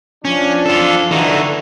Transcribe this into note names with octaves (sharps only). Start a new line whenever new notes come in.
F3 C#4 D4
F4 A4
D3 E3 D#4 F#4